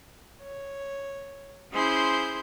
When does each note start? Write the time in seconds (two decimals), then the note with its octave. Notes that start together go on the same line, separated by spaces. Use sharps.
0.42 C#5
1.73 C#4 E4 G#4 C5 C6 G6